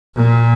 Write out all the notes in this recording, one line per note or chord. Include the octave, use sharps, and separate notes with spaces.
A#2